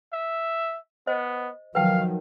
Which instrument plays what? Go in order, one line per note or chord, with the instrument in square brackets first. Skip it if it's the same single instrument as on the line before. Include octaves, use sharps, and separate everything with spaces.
[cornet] E5
[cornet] B3 [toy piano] C5 D#5
[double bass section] D#3 F3 F#3 [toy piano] B4 G5 A5 [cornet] F5